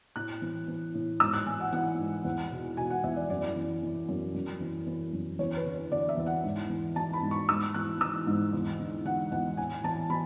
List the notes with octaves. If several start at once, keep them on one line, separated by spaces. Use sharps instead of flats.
A2 F#6
E3
E3
A2
G#2 E6
F#6
E3 G#5
F#5
E3 F#5
G#2
E2
B2
B2 G#5
F#5
E2 E5
D5
F#2 D5
E3
E3
F#2
F#2
E3
E3
F#2
E2 C#5
B4
D3
C#5
D3 D5
E5
E2
F#5
G#2
E3
E3 A5
B5
G#2
C#6
G#2 E6
E3 F#6
E3 E6
G#2
E2
D3
D3 F#5
E2 F#5
A2 G#5
E3 A5
E3 B5